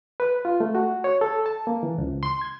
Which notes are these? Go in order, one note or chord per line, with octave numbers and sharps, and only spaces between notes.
B4
F4
A3
F#4
C#5
A4
A5
A#3
E3
C#2
C6
G#6